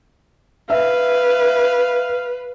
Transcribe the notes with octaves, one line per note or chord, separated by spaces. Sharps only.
B4 E5 F5